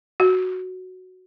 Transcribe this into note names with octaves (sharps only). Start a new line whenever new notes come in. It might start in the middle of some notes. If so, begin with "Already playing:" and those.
F#4